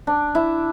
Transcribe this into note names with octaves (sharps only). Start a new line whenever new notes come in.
D4
E4